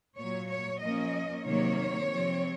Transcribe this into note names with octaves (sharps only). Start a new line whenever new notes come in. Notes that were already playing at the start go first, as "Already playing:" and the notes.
A#2 F#3 A#3 C#5
C#5
F3 A#3 C#4 D#5
C3 D#3 F#3 A#3 C#5
C3 F3 G#3 C4